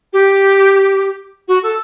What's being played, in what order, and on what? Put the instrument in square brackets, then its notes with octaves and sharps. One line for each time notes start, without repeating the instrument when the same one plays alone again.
[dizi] G4
F#4
A4